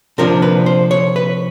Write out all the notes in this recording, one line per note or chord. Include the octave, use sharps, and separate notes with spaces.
C3 F3 A#3 D4 A#4
B4
C5
C#5
B4